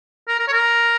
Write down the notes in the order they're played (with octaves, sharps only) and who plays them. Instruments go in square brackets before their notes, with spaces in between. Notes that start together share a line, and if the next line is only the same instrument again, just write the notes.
[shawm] A#4
A#4
C#5
A#4